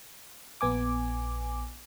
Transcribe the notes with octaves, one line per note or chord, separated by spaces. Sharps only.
A#1 B3 G#5 D6